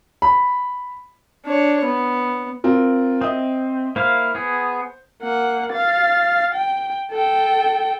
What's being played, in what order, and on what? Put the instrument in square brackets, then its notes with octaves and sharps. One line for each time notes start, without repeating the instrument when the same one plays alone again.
[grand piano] B5
[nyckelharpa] D4 C#5
B3
[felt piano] C4 F4 A#4
[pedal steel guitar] C4 [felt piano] D#5 E5 D#6
[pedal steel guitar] A#3 E4 F5 [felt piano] C5
[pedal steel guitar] B3 G#4
[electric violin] A#3 F#5
F5 A6
G5
A4 G5